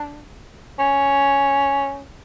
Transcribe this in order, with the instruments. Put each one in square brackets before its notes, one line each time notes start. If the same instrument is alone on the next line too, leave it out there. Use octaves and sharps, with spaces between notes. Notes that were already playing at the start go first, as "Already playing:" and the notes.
Already playing: [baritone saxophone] D4
C#4